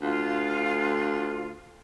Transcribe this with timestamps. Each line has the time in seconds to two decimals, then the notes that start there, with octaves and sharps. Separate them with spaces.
0.02 D2 F4